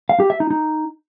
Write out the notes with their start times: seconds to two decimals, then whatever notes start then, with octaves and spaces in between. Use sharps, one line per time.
0.09 F5
0.20 G4
0.30 E5
0.40 D#4
0.50 D#4